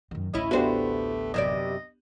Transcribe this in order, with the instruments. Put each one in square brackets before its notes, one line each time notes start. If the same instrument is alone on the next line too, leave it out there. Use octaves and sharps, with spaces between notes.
[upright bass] F#2 D#3
[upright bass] A1 D2 [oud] C#4 E4 [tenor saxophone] D#5
[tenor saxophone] A3 [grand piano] B3 D4 G4 [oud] F#4 C5
[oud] F#2 C3 D5 [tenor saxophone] D#5